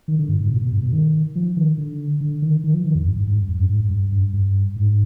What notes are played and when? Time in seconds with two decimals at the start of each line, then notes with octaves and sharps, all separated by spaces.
0.08 D#3
0.19 D3
0.29 G2
0.40 G#2
0.51 B2
0.61 B2
0.72 G2
0.82 B2
0.93 D#3
1.35 F3
1.57 D#3
1.78 D3
2.21 D3
2.42 D#3
2.64 D#3
2.74 F3
2.85 D#3
2.95 F2
3.06 G2
3.16 G2
3.27 G#2
3.38 G2
3.48 F2
3.59 G2
3.69 G#2
3.80 G2
3.91 G2
4.12 G2
4.33 G2
4.76 G#2